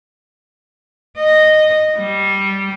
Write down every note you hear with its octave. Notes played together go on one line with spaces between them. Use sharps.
D#5
G3